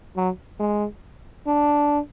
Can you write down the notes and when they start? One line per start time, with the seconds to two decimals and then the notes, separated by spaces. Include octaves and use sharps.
0.17 F#3
0.60 G#3
1.47 D4